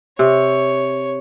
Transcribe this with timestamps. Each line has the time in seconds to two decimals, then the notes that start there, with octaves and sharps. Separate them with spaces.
0.19 C3 C#5